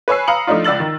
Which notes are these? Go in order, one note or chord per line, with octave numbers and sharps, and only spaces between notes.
B4 C#5 G#5 E6 C7
F5 A#5 B5 D#6 C#7 F#7
F3 A3 D4 D#4 F4
C#2 D5 E6 A6 F#7
D#3